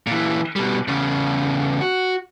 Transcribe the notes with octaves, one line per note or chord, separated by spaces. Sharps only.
A#2 E3
B2 G3
E2 C#3
F#4